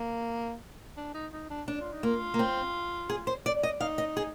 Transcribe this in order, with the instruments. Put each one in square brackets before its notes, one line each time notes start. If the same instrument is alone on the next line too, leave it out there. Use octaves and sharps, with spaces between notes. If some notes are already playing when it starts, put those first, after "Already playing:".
Already playing: [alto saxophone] A#3
D4
D#4
D#4
D4
[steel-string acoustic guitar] D4
[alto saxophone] F4
D#4
[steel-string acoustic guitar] A#3 [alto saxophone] F4
[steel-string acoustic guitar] A#3
C4
G#4
C5
D5
D#5
[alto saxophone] D#4 [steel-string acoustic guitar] F5
[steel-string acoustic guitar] D#5
G#4